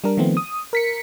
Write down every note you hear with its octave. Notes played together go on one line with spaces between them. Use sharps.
G3 D4 A#4
D#3 F3 A3 B3 C4
D#6
A#4 B6 C#7